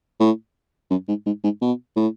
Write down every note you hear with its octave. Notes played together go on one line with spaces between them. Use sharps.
A2
F#2
G#2
G#2
G#2
B2
A2